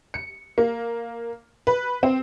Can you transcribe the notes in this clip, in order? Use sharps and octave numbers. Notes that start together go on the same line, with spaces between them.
C#7
A#3
B4
C4